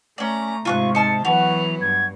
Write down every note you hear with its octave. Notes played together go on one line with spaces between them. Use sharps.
A3 C#4 D5 A#5
G#2 C3 F4 C#6 F#6
D#4 A5 F6 C#7
E3 F#3 B3 F#4 F7
G2 G#6